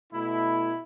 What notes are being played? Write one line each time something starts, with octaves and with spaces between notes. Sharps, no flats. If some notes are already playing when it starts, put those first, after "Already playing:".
B2 A3 E4